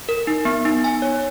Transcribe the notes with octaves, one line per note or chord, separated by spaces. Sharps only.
A#4
D#4
B3
D#4
G#5
C#5